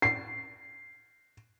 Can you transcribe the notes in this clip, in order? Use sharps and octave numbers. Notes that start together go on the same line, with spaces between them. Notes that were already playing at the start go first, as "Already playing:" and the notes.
C7